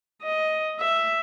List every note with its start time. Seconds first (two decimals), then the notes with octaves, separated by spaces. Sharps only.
0.23 D#5
0.80 E5